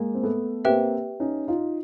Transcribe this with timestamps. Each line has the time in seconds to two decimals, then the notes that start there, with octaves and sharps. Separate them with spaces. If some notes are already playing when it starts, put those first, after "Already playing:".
Already playing: G#3 A#3
0.15 C4
0.23 A3 B3
0.65 A#3 C4 G4 B4 E5 G5
1.20 C#4 D#4
1.48 D#4 F4